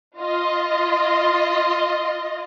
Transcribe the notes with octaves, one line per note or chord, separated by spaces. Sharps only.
F4 D#5